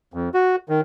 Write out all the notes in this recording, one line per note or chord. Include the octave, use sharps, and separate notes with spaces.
F2
F#4
D#3